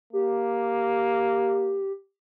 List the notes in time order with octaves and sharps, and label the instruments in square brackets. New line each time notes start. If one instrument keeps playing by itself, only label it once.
[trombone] A#3 [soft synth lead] G4